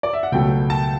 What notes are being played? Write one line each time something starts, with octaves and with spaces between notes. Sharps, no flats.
D5
E5
F#5
C#2 B2 F#3 A3 G5
A5